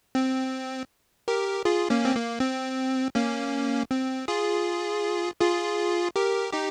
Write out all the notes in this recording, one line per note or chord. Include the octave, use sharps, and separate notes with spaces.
C4
G4 A#4
F4 G#4
A#3 C#4
C4
A#3
C4
A#3 C#4
C4
F4 G#4
F4 G#4
G4 A#4
D#4 G4